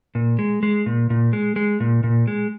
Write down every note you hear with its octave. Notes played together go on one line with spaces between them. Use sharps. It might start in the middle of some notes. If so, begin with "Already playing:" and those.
A#2
G#3
G#3
A#2
A#2
G#3
G#3
A#2
A#2
G#3